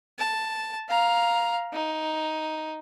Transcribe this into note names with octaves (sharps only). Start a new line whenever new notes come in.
A5
F5 A#5
D#4